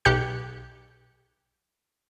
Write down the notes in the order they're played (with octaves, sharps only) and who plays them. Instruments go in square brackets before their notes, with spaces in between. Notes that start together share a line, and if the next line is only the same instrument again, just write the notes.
[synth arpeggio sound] B1 G4 F#6 G6 C#7